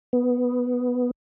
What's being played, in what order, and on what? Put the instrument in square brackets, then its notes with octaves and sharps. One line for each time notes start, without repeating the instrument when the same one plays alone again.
[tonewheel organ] B3